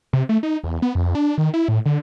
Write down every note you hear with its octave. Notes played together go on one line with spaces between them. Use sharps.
C3
A3
D#4
E2
B3
F2
D4
D#3
E4
A2
D3